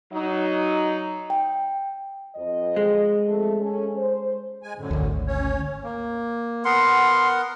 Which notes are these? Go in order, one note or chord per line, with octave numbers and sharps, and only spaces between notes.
F#3 D#4
G5
F2 D#5
G#3
F2 A3
C#4 A4
C5
G#3 G#5
F#2 A2 D3
G#1 D2
C#4 C#5
A#3
B3 A#4 F#5 C6